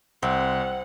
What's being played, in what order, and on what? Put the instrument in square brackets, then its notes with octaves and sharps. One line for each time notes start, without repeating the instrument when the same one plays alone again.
[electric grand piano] C2 [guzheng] C4 [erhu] F#5